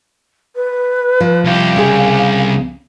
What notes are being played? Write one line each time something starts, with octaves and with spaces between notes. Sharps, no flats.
B4
F3
C2 G4 F5
C#3 G#4